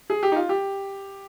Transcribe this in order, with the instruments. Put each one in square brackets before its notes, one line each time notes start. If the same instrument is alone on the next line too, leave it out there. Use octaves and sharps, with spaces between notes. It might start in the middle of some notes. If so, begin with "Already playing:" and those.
[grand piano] G#4
G4
D#4
F4
G4